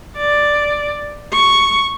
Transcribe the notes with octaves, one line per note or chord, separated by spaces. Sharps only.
D5
C#6